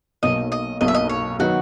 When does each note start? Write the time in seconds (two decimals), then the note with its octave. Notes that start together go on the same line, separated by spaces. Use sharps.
0.23 B1 B2 A#3 D#5
0.52 D#5
0.81 B1 B2 A#3 D#5
0.88 E5
0.95 D#5
1.09 C#5
1.40 D#3 F#3 B3 D#4 F#4